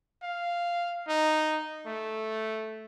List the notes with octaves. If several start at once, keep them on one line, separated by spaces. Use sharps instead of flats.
F5
D#4
A3